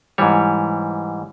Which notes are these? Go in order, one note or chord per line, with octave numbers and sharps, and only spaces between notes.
G#2 E3 G3 C#5